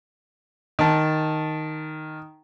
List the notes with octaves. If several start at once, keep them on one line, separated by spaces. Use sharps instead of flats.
D#3 A5